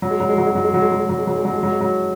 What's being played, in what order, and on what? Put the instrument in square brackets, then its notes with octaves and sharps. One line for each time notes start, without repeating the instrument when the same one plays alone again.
[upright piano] F#3
G#3
F#3
G#3
F#3
G#3
F#3
G#3
F#3
G#3
F#3
G#3
F#3
G#3
F#3
G#3
F#3
G#3
F#3
G#3
F#3